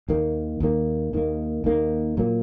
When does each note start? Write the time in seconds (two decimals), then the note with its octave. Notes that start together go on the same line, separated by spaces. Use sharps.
0.08 D#2 D#3 A#3
0.60 D#2 D#3 A#3
1.13 D#2 D#3 A#3
1.64 D#2 D#3 A#3
2.17 A#2 F#3 A#3